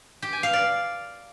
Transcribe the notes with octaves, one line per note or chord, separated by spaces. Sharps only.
G4
G#5
F5
D5